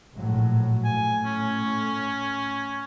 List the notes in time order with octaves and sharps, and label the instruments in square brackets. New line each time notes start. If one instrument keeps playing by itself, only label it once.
[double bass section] A#1 A2 F#3
[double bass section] A2 [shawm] G#5
[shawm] C#4